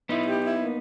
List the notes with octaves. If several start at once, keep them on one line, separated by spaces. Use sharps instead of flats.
B3 D#4 E4
G4
E4
A#3